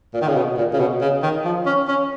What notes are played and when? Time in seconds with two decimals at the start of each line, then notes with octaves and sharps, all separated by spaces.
0.14 A#2
0.21 D#3
0.28 C#3
0.36 B2
0.57 A#2
0.73 C#3
0.79 B2
1.01 C#3
1.23 D#3
1.45 F3
1.66 C#4
1.88 C#4